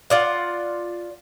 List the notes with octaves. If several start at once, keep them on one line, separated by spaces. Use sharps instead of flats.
F4 D5 F#5